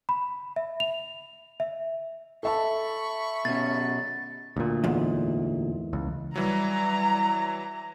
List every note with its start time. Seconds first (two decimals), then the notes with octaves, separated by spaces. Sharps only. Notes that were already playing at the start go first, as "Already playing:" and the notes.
0.09 B5
0.56 E5
0.80 F7
1.60 E5
2.43 A4 E5 A5 B5 C#6
3.45 B2 C#4 A6
4.56 D2 A#2
4.84 E2 G#2
5.93 C#2
6.36 E3 F#3 G3 A#5